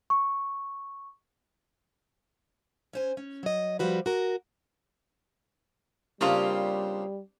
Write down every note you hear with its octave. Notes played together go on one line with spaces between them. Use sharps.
C#6
C#4 C5 G#5
C#4
F#3 D#5
F3 G3 F#4 B4
F#4 A#4
C#3 G3 A#3 C4 D4 F4 G4